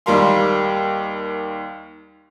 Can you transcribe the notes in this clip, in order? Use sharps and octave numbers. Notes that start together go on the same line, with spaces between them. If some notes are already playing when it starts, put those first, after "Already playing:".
D#2 G3 A#4 F5 C6